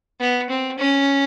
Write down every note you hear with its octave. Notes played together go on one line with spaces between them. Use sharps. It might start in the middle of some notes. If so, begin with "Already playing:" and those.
B3
C4
C#4